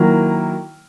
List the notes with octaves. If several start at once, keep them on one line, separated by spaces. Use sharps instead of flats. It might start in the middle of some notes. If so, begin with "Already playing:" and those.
Already playing: D#3 F#3 A#3 E4 A#4